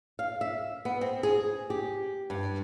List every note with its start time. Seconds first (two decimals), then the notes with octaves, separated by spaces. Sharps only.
0.19 F5
0.41 E5
0.85 B3
1.01 C4
1.23 G#4
1.70 G4
2.30 G2